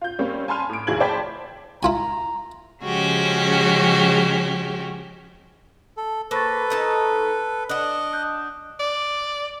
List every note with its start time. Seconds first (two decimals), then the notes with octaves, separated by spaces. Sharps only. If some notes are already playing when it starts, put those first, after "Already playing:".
0.01 F4 G6
0.19 G3 A#3 C4 C#4
0.48 G#5 A5 B5 C6 F6 D#7
0.69 A2 D7
0.87 F1 D#2 E4 G#4 G#6 F#7
1.00 C5 D5 G5 A5 B5 B6
1.83 E4 F4 G#5 A#5
2.84 C#3 F3 G#3 C#4 F#4 G4
5.97 A4
6.31 A#3 A4 B4 C5 C#6 A6
6.70 A3 D#4 A5
7.69 D4 D#5 F#5 F#6
8.13 D#6 F#6 G6
8.80 D5